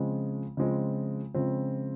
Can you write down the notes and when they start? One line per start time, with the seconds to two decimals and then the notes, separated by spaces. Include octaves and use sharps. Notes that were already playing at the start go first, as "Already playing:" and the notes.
Already playing: C#3 F3 G#3 C4
0.57 C#3 F3 G#3 C4
1.34 C#3 F3 G#3 C4